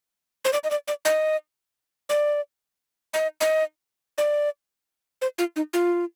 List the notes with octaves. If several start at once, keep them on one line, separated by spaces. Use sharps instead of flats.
C5
D5
D#5
D5
D5
D#5
D5
D#5
D#5
D5
C5
F4
D#4
F4